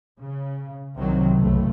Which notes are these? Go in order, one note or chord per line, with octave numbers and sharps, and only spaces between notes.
C#3
C2 C3 D#3 F#3
F#1 B1 A3